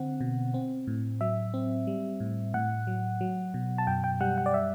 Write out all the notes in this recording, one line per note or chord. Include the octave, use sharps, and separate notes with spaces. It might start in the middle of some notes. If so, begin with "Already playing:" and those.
Already playing: D3 C4 F#5
B2
C4
A2
F#3 E5
C4
G3
A2
A2 F#5
F#3
F#3
B2
A5
F#2 G5
G5
G3 F#5
F#5
D5
E5